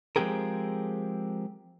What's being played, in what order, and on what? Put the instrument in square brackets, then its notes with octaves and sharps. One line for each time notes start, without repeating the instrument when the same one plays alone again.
[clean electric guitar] F3 G#3 C4 G4 G#4 A#4